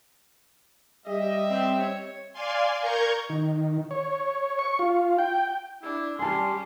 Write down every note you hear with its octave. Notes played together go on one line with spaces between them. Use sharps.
G3 G4 D#5 E5
C4
C#5
D5 F5 G#5 C6
A#4 A#5 C#6 G6 G#6
D#3
C#5
C#6
F4
G5
D4 E4
G3 C#4 G#5 A5 C6